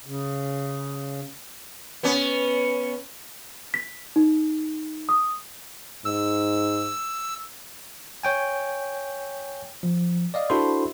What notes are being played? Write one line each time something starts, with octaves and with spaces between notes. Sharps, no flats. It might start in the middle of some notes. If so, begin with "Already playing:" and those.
C#3
B3 C#4
B6
D#4
D#6
G#2 E6
C#5 G5 G#5
F3
D5 D#5 F5
D4 E4 F#4 A4 C5 C6